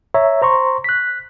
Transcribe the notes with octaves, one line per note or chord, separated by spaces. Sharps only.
C#5 E5 A#5
C5 A#5 C6 C#6
F#6 B6